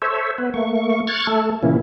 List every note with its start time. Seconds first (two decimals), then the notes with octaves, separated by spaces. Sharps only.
0.02 A4 C5 C#5 E5
0.38 B3 B4
0.54 A3 A#3 C#6
1.07 C#6 F6 F#6 G#6 A6
1.27 A3 A4
1.63 A#2 C#3 E3 A#3 C#4 E4